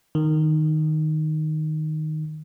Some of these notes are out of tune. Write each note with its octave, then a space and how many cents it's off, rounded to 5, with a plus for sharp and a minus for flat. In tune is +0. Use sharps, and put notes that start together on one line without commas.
D#3 -5